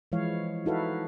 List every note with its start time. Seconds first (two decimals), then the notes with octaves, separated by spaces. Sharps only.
0.12 E3 F3 G#3 E4 C#5 F5
0.66 D#4 E4 F#4 A4 B4 F5